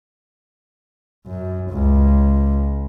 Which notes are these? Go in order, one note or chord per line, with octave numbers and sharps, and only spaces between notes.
F#2
C#2